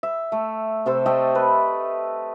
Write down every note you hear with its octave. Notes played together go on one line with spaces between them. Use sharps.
E5
A3
C3 A4 C5
A3 D#5 E5 G5
B4